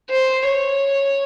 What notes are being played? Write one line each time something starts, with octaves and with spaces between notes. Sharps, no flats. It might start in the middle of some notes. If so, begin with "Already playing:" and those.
C5
C#5